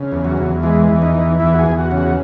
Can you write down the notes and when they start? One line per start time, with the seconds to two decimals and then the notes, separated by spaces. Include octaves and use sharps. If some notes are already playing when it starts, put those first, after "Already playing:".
Already playing: C#3
0.12 E2
0.25 F#3
0.37 E2
0.63 E3 G#3
0.88 E2
1.02 D#4
1.15 E3
1.40 E2 E4
1.54 F#4
1.59 G#4
1.66 E2
1.79 F#4
1.91 C#3
1.98 F#4